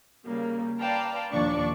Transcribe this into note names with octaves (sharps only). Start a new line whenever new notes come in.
C#3 G3 A#3
B4 D5 F5 G5 A5 A#5
D#2 A#2 F3 D4 D5 C#6